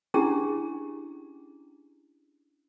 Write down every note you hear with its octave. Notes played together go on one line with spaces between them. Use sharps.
C#4 D4 E4 G4 G#4 A#5